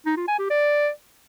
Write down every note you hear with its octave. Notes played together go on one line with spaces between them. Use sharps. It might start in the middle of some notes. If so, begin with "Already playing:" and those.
D#4
F4
G#5
G4
D5